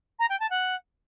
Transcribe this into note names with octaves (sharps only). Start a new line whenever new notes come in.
A#5
G5
A5
F#5